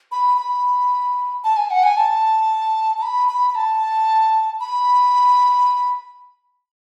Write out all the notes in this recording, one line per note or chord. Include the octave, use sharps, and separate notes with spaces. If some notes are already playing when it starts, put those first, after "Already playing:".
B5
B5
A5
G#5
F#5
G#5
A5
A5
B5
B5
B5
A5
B5